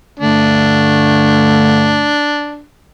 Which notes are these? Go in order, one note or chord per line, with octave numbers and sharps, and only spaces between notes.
G2 D3 A3 D4